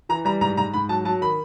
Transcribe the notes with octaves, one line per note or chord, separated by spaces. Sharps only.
E3 A#5
G3 A#5
G#2 A#5
G#2 A#5
G#2 B5
F#3 A5
F#3 A5
D#3 B5